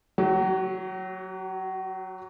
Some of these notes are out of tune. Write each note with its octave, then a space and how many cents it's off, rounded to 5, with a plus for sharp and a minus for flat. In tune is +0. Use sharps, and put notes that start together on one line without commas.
F#3 +0 F#4 +40